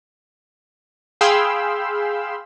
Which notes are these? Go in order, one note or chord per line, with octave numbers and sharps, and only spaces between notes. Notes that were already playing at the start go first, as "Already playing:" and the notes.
G#4 F5 G5 B5 C6 E6